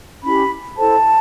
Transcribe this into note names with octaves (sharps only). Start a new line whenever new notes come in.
C#4 E4 G4 B5
E4 A4 C5 A5